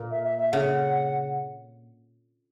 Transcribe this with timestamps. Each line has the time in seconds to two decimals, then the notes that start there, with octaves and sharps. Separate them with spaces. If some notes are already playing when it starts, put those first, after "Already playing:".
Already playing: A#2 A#3
0.11 E5
0.24 E5
0.38 E5
0.52 C#3 F#5